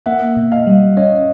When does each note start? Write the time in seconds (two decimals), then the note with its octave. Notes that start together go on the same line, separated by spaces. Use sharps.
0.06 A#3 E5 F#5
0.37 B2
0.52 D#5 F5
0.67 G3
0.97 C#4 C#5 D#5